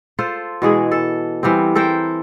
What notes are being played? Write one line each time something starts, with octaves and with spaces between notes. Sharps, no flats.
F4 A4 C5
B2 E3 G#3 G#4
A4
E3 G3 B3 C4
A4 A#4 C5 G5